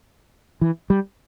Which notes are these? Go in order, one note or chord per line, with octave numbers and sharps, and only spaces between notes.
E3
G3